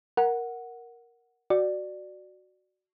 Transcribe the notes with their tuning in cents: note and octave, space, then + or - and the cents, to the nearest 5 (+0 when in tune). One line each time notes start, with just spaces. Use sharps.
A#4 +5 F#5 +0
F#4 +5 D5 +15